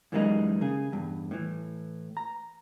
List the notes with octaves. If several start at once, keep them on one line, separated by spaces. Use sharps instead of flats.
F#2 E3 G3 G#3 A#3 D#4
C#3 G#4
E2 G2
A2 E3
A#5